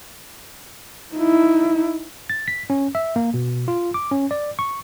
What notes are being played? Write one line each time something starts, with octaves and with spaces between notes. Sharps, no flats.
D#4 E4
A6
B6
C#4
E5
A#3
B2
F4
D6
C#4
D5
C#6